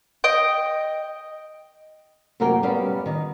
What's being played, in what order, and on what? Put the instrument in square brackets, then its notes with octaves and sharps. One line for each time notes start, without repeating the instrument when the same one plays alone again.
[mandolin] D#5 G5
[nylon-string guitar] F#2 C3 A#3 F#4 A#4 G5
G3 B3 C#4 G4 F5
D#3 D#4